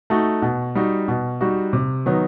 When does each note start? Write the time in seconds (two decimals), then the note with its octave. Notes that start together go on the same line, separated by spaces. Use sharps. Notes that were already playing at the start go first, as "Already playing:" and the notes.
0.10 A3 D#4 F#4
0.42 B2
0.75 G3 D#4 F#4
1.08 B2
1.41 G3 D#4 F#4
1.73 C3
2.06 D#3 F#3 B3 D#4